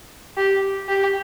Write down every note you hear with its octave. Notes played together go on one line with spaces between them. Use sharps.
G4
G4